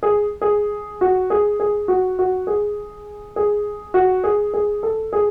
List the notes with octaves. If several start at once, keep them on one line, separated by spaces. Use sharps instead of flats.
G#4
G#4
F#4
G#4
G#4
F#4
F#4
G#4
G#4
F#4
G#4
G#4
A4
G#4